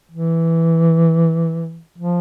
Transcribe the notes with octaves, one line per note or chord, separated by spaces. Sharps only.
E3
F3